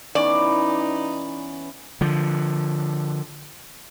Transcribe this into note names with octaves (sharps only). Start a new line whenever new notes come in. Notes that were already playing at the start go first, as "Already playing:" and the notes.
E3 B3 C#4 D#4 D5
D3 F3